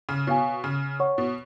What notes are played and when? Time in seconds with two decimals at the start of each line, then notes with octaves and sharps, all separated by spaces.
0.09 C#3
0.27 B2 C#5 F5 G#5
0.64 C#3
1.00 C#5 F#5 C#6
1.18 B2